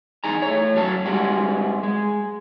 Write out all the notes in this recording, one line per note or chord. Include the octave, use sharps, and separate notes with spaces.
E2 D#4 G#4 A#5
A3 C#5
F#2 F#3 A5
G2 G3 G#3 F#4
G#3